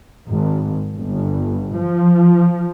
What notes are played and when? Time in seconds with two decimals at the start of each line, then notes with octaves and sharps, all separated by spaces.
0.29 G#1
0.94 G1
1.77 F3